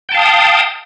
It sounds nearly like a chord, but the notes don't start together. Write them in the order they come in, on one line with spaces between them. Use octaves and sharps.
G5 A5 F5 D#6